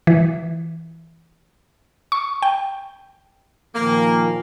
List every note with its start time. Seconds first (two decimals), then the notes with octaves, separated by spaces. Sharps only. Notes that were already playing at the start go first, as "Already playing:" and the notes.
0.07 E3
2.12 C#6
2.42 G5
3.76 A#2 D#3 F3 A#3